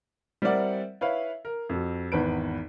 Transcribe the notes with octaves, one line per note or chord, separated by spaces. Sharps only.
G3 C4 E4 A#4 D5 F#5
E4 B4 C#5 F5
A#4
F2 F#4
G#1 E2 B4 D7